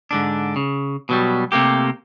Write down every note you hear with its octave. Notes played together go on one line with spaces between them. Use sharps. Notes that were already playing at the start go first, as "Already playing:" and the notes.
G#2 D3 D4
C#3
B2 F#3 G3
C3 A3 A#3 G4